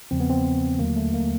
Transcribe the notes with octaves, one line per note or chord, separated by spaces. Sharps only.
E2 C#3 F3 C4
B3
C4
D#2 D3 F#3 A3 A#3
A3
A#3